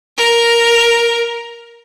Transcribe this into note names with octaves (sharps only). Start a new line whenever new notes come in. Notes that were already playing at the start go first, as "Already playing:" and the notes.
A#4